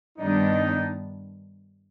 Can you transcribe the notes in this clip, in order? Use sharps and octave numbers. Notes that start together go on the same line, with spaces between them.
G2 D#3 G3 B3 D4 D#4